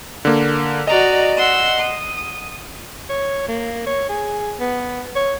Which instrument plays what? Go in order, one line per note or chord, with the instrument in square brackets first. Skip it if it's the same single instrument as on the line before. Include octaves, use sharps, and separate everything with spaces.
[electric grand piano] D3 A#3
[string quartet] F#4 D5 A#5 [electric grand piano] D#5
[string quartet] F#5 C6 E6
D#6
[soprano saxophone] C#5
A#3
C#5
G#4
B3
C#5